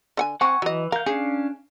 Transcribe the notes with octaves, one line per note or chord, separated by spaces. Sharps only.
D3 F#5 G#5
C4 F#5 G#5 C#6
E3 F#3 D#5
A#4 F5 G6
C#4 D4 G#4 F5